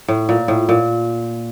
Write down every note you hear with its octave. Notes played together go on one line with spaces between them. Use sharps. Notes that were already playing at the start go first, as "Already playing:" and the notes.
A2
A#2
A2
A#2